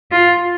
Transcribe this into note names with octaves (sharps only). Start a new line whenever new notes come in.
F4